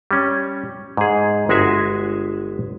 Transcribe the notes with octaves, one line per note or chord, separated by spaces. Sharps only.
G3 C#4
G#2 G#4
G1 G#3 F#4 G#4 E5 G#5